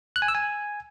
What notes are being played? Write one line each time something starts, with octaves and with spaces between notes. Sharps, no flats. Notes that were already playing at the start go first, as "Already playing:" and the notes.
F#6
G#5
E6
G#5